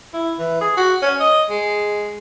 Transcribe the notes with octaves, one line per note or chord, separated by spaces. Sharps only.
E4
E3
G#4
F#4
C#4
D#5
G#3